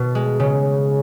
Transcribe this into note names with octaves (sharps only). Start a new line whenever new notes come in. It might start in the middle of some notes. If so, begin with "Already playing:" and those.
Already playing: B2
G#3
C#3